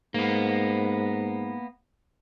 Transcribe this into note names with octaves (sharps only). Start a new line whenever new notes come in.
G#2 A#3 B3